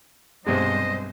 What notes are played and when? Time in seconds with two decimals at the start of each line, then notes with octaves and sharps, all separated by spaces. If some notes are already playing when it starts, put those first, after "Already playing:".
0.46 B1 G2 C3 G#3 C5 D#5